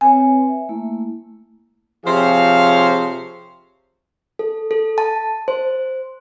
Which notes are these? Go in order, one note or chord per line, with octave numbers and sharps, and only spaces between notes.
C4 B4 C#5 G#5
E5
A3 A#3 E4
C3 F3 G#4 C5 C#5 F5
A4
A4
A5
C5